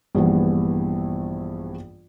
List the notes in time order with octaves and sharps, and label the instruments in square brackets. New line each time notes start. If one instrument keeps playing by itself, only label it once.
[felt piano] A#1 G2 E3 B3